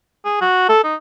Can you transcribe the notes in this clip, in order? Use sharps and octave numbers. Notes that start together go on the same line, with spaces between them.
G#4
F#4
A4
D#4